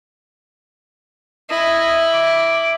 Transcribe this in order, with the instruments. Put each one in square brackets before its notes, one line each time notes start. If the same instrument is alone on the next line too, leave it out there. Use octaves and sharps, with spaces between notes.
[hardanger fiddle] E4 [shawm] D#5
[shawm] D6